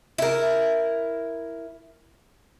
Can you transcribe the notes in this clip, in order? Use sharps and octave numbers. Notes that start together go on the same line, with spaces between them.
E4 A#4